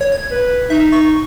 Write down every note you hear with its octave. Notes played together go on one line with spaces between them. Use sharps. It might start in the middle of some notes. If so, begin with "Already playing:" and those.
C#5
G#6
B4
D#4 E5
C#6